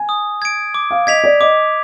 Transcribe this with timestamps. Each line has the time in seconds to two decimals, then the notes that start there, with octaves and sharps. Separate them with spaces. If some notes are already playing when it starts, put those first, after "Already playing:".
Already playing: G#5
0.09 D#6
0.42 G#6 D7
0.74 D6
0.91 F5
1.07 D#5 G#6 B6 F7
1.24 D5
1.40 D#5 D6